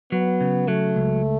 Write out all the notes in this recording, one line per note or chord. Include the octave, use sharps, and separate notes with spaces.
F#3 B3
C#3
F#3 A3
C#2